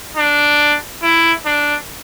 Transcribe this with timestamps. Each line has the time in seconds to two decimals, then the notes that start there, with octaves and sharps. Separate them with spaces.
0.17 D4
1.03 E4
1.46 D4